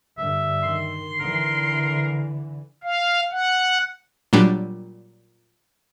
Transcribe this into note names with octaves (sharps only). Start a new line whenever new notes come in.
G2 D3 E5
D#3 C6
D3 E3 A#4
F5
F#5
A#2 F#3 G3 D4